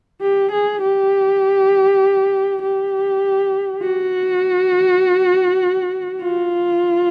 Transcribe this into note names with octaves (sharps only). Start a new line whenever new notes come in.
G4
G#4
G4
G4
F#4
F4